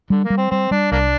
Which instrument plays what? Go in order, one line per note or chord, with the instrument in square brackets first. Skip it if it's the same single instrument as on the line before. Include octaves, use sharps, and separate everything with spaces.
[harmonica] D3 [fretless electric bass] G3
[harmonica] A#3
[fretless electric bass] G3
[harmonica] C4
[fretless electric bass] G3 [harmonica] C4
[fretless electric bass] G3 [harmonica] D4
[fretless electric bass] C2 [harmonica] A#3 D4